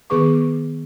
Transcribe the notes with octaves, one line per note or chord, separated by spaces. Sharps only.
D#3 B3 G#4 B4 C#6 D6